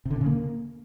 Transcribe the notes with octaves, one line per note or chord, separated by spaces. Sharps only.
C3
D3
C3
C#3
A#3